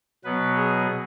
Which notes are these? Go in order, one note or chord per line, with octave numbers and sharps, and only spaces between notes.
B2 F#3 B3 B4
G#4